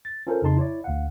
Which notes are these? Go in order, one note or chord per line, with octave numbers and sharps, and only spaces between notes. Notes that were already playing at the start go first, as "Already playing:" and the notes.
A6
C#4 F4 A4 A#4 C5
F2 C#3 D#4 A5 C6
E4 C#5 D5
D2 F5 F#5